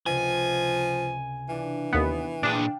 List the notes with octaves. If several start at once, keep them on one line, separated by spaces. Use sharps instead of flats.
C#2 C3 F3 G#5
E3 D4 F4
D#2 B3
A#2 D4 G#4 F5 G5